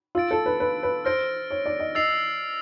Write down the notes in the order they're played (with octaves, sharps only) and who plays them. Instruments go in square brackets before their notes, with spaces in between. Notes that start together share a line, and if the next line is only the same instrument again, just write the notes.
[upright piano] F4 [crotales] E6 A6 D7
[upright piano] A4
B4
B4
B4
[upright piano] C5 [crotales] F6 A#6 D7
[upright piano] C#5
D5
D#5
[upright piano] D#5 [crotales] E6 A6 C7 F7